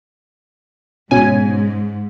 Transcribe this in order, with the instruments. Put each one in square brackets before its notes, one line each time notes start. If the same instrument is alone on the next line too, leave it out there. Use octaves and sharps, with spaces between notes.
[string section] G#2 [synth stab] B2 C#4 G#5